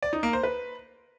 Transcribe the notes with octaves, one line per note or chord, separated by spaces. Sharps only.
D5
D#4
A#3
C5
B4